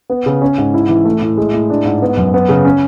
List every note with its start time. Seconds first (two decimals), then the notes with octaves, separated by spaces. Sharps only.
0.10 B3
0.26 C#3
0.42 C#4
0.58 G#2
0.74 E4
0.89 E3
1.05 A3
1.21 A2
1.37 G#3
1.53 A2
1.70 D4
1.85 G#2
2.02 B3
2.17 F#2
2.34 B3
2.49 C#3
2.65 C#4